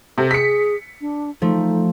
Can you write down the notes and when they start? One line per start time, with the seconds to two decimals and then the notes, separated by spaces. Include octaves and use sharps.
0.18 C3 A4
0.31 G#4 B6 C#7
1.01 D4
1.42 F3 A3 D#4